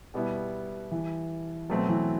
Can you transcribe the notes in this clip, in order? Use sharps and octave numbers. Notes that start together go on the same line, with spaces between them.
B2 G3 B3 E4
E3
B2 F#3 A3 C4
E3